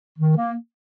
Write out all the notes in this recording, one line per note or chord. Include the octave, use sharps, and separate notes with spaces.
D#3
A#3